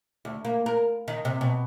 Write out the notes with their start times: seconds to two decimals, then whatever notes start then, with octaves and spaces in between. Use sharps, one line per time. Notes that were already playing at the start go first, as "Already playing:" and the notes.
0.25 D2
0.45 A#3
0.66 A#4
1.08 D#3
1.25 C3
1.41 B2